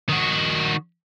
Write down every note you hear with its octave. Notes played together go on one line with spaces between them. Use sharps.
D#3 F#4